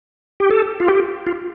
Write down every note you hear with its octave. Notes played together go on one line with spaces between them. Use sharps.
G4
A4
F4
G4
F4